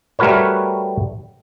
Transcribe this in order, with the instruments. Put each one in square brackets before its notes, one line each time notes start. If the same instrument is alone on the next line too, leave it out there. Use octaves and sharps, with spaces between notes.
[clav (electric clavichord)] G3 A3 F#4 A#4 B4 C#5